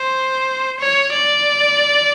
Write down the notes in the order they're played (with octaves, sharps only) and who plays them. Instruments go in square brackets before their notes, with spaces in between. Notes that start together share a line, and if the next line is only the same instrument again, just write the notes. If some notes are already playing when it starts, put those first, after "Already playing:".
Already playing: [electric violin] C5
C#5
D5